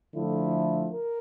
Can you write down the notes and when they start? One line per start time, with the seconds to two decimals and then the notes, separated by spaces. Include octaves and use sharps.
0.13 D3 F3 A3 E4
0.90 A#4